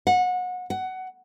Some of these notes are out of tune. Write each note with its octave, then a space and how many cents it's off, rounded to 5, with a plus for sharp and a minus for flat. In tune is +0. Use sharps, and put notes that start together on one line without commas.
F#5 -25
F#5 +15